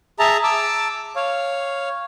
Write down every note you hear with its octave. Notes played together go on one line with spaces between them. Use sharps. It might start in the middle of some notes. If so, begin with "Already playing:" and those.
G#4 E5 A5 A#5
A5 D6 E6
C#5 F5